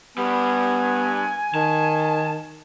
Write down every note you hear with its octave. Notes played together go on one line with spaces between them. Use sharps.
G2 G3 B3 G#5
D#3 A5